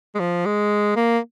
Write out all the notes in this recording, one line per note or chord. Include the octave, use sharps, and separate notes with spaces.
G#3
F3
G#3
A#3